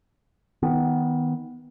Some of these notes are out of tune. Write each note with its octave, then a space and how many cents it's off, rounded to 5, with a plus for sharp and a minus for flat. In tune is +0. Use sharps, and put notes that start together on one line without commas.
D#3 +15 B3 +0